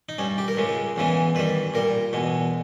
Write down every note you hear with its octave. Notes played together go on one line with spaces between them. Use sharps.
D#4
G2 G3 C#4
G4
A#4
C#2 C#3 G#3
E2 C#3 E3 G#3
G2 D#3 G3 B4
A#2 G3 A#4
E2 B2 G#3